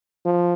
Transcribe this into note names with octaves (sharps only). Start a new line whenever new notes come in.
F3